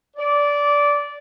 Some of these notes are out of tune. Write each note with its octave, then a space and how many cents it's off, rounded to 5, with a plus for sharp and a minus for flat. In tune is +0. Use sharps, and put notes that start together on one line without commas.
D5 -15